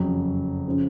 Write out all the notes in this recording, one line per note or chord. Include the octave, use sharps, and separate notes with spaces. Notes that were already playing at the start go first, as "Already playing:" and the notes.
Already playing: F#1 F2 C#3 F#3
C#3 F3